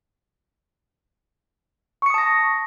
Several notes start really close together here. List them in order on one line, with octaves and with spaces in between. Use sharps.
C#6 C#7 D#6 A5 A#6